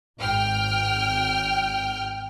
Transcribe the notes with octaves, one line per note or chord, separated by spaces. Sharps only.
G#1 G5 F6